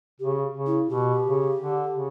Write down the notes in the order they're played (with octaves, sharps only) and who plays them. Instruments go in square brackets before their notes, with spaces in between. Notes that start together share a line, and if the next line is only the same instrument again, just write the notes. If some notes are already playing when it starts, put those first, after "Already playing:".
[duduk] C#3 [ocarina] G4
[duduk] C#3
[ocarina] E4
[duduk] B2 [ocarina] G4
[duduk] C#3
D3
C#3